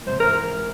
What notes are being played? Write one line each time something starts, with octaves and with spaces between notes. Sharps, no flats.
A#2
G#2 C3 C5
C3 E3 A#4